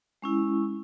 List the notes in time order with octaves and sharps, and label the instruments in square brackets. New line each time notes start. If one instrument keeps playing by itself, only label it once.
[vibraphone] G#3 C#4 E4